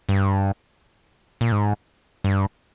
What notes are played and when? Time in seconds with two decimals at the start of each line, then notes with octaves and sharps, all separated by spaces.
0.09 G2
1.41 A#2
1.52 G#2
2.24 G2